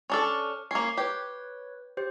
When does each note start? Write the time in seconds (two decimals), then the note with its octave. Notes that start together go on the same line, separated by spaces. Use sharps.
0.10 C#4 D4 A4 C#6 F6
0.71 A#3 C#4 C7
0.97 G4 B4 C#5
1.97 G4 C5